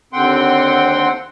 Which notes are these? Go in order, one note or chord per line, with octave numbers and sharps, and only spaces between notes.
D#2 D3 C4 F#5 G5 C6